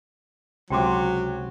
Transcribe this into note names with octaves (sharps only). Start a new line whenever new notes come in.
C#2 C3 F#3 G5 C6 D6